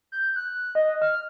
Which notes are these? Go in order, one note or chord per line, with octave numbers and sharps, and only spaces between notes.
G6
F#6
D#5
F6